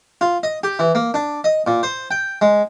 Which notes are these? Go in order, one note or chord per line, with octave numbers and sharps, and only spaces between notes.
F4
D#5
G4
E3
A#3
D4
D#5
A#2
C5
G5
G#3